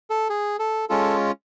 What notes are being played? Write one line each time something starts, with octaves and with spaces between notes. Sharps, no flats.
A4
G#4
A4
G#3 C#4 F4 A4